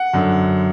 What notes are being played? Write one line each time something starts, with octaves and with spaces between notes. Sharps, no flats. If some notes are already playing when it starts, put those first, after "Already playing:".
Already playing: F#5
F#2 D3